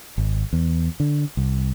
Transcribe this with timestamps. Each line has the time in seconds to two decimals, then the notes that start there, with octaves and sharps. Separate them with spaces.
0.18 G#1
0.53 E2
1.00 D3
1.37 C2